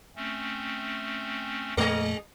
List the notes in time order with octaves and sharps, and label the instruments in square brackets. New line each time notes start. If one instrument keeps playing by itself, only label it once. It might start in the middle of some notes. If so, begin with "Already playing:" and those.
[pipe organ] A3 C4 C#4
[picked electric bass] F2 A#2 A3 [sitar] G#3 D#5